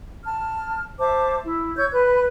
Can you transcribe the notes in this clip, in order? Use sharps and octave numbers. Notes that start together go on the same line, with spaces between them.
A5 F6
C5 E5 A5 D6
E4
C#5 C#6 E6 G6
B4 B5 F#6